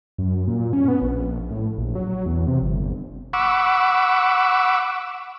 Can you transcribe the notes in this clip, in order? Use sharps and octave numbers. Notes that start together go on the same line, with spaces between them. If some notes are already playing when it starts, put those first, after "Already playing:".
F#2
A#2
C#4
B3
A#1
A2
A#1
F#3
E2
C3
G1
F#5 B5 C#6 D6 E6